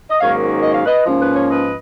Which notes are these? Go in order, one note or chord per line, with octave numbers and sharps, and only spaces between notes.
D#5
G#2 D#3 F#3 A#3 C#4 C#5 F5
D#5
F5
B4 D#5
G#2 F3 A#3 C#4
B4
C#5
B4 D#5